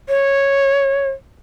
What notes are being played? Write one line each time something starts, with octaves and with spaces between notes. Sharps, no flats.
C#5